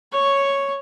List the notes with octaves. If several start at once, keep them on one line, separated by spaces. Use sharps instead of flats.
C#5 C#6